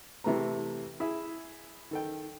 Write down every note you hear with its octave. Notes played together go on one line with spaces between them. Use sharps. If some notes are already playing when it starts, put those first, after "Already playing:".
C3 E3 A3 B4 A#5
E4 G#4 E5
D#3 A4 G5